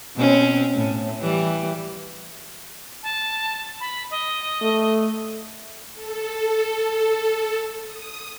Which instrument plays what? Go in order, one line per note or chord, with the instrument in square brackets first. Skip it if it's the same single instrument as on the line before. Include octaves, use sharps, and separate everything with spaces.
[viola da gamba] B2 C4 C#4
A2
E3 G3
[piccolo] A5
B5
D#5
[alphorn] A3
[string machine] A4
D#6